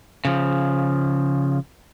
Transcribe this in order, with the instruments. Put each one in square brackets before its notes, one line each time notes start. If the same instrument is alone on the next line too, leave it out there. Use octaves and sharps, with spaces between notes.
[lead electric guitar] C#3 F3